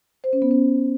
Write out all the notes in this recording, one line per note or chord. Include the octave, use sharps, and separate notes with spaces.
C5
C#4
B3
C#4